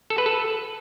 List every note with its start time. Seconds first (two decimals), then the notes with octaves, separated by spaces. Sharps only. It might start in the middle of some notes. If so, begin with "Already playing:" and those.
0.10 A4
0.18 B4
0.26 A4